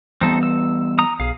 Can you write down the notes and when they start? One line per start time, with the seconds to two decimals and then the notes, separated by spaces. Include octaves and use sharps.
0.21 E3 G3 B3 C4 D#4 A4
0.43 E6
0.99 A#5 D#6
1.20 B1 G#4 F5